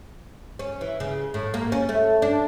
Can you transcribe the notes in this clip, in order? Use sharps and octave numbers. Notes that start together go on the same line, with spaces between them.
C#4
E3
C#3
A2
A#3
C#4
A3
D4